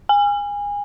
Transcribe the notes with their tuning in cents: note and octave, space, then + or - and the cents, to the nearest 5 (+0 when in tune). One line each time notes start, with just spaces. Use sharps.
G#5 -25